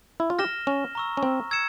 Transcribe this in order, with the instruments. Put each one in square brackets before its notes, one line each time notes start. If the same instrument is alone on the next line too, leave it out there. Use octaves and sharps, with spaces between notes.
[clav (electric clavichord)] E4
F4
[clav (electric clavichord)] G4 [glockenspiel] F6 A#6 E7 G7
[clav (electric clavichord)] C#4
[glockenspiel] A#5 C#6 E6
[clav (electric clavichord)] C#4
C4
[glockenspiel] E6 G#6 C#7 E7